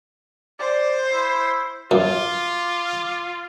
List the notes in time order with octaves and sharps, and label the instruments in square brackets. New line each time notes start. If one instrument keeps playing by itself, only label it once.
[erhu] C5 [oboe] D5
[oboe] E4
[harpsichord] F#2 [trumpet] F4 [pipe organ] D6